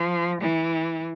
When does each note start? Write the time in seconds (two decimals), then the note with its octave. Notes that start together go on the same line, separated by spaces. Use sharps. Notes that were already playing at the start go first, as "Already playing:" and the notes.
Already playing: F3
0.41 E3